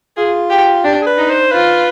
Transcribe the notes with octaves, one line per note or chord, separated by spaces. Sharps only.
F4 G#4
G4
D4 G4
G#4
B4
D#4
C5
F4 B4